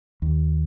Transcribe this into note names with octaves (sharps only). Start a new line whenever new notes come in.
D#2